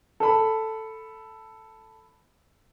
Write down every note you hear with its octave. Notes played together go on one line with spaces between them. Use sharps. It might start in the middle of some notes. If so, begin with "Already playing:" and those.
A4 B5